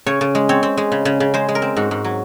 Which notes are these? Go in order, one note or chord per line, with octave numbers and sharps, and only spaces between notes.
C#3 C#5
C#3
G#3
C4 C#5
C4
G#3
C#3
C#3
C#3
G#3 C5
G#3
A#4
C4
G#2 F#4
G#2
F#3